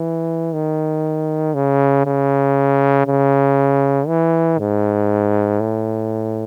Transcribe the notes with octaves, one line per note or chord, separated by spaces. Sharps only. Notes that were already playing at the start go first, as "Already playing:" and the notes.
Already playing: E3
D#3
C#3
C#3
C#3
E3
G#2
A2